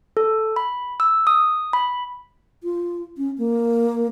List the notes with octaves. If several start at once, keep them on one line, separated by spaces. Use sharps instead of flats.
A4
B5
E6
D#6
B5
F4
C#4
A#3